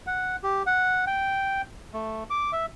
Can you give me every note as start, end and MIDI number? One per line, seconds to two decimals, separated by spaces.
0.07 0.36 78
0.43 0.63 67
0.66 1.05 78
1.07 1.62 79
1.93 2.24 57
2.30 2.51 86
2.53 2.66 76